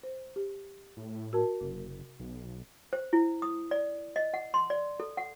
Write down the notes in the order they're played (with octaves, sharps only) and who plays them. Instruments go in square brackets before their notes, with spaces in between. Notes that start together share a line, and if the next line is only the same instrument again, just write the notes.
[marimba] C5
G4
[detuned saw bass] A2
[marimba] F#4 A#4 A5
[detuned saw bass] F#1 [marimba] C3
[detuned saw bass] B1
[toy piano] C5
E4
D#6
D5
D#5
F#5
C6
D5
A4
F#5